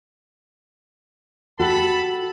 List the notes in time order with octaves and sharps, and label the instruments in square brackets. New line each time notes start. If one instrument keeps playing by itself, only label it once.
[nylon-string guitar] F#4 G4 [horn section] A4 A5 B5